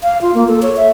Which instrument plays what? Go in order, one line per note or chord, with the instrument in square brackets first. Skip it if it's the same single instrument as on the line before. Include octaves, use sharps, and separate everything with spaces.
[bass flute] F5
F4
A#3
A4
C#5
E5